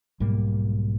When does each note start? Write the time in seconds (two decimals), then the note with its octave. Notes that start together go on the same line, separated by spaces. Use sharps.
0.20 B1 G#2 G3 A#3